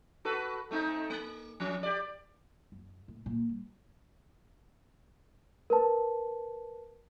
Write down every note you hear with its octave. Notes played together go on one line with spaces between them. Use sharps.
F#4 A4 B4
A3 C4 D#4
A#3
F3 C#4
G4 D5
F#2
A2
A#2
G3
A#4 B4 A5